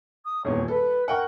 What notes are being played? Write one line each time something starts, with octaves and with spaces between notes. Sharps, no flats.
D#6
D#1 E2 A#2 C#5
A4 B4
A#4 F#5 G5 C#6